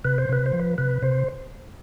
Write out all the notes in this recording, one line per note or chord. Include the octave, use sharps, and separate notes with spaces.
C3 B4
C5
C3 B4
C5
F3
B4
C3 B4
C3 C5